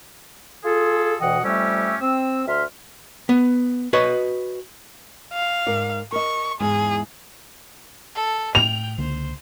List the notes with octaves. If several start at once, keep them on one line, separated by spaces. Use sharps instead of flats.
F4 G#4 A4
D2 B2 E3 D#5 F#5 G5
F2 G3 A3 C#4 G4 E6
C4 E6
D2 E5 C6 F6
B3
F#4 B4 C#5 D#5
F5
G#2 A#4 D5
A#4 D#5 C#6
E2 G#2 G#3 G#4
A4
A2 G5 F7
C#2 D3 A#3 C5